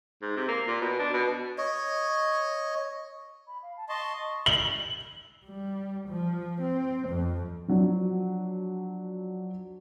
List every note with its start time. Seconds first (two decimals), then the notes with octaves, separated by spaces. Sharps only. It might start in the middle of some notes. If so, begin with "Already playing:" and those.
0.22 G#2
0.36 C3
0.48 A#3
0.67 A#2
0.82 B2
0.99 D4
1.14 B2
1.58 C#5 D#5
3.47 B5
3.63 F5
3.77 A5
3.89 D#5 A5 C6 C#6
4.46 F#7
5.45 G3
6.08 F3
6.62 C4
7.08 F2
7.68 F3 F#3 D4